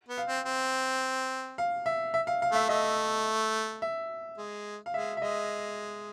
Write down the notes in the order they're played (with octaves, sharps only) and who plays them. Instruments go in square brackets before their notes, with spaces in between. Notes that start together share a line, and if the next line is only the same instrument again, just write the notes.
[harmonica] B3
[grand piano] F5
[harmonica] C4
C4
[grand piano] F5
E5
E5
F5
F5
[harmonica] A3 [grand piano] E5
[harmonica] A3 [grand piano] D#5
[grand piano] E5
[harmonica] G#3
[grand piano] F5
[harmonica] G#3 [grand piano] E5
[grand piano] E5
[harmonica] G#3 [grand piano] D#5